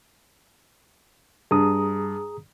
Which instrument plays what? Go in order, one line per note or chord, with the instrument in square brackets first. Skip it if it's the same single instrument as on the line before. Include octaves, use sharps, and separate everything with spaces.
[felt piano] G2 [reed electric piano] G#4 A#5 D#6